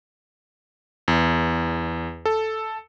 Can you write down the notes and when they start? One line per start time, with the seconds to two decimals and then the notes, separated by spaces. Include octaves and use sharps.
1.08 E2
2.25 A4